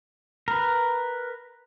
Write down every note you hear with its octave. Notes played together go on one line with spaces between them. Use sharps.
A#4 B4